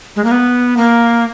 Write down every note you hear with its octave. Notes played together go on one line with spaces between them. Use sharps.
G#3
A#3
B3
A#3